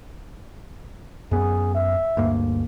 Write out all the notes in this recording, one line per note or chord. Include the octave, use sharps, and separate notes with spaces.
F#2 B3 G#4
E5
D2 G2 A#3